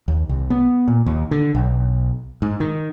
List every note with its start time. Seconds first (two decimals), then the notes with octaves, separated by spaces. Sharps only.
0.08 D#2
0.29 C2
0.50 B3
0.88 A#2
1.06 D#2
1.31 D3
1.55 B1
2.42 G#2
2.60 D#3